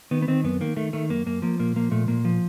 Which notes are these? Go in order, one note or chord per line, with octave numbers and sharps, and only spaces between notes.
D#3 B3
B3
D#3 C4
F#2 B3
D#3 A#3
D#3 A3
D#3 A3
F#2 A#3
F#2 A#3
F3 A#3
A#2 A#3
F3 A#3
A#2 A3
A#2 A#3
F3